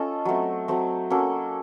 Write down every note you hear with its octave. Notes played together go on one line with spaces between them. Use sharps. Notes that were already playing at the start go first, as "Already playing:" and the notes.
Already playing: C#4 F4 A4 D#5
F#3 A3 C4
F#3 A3 C4
F#3 A#3 C#4 A4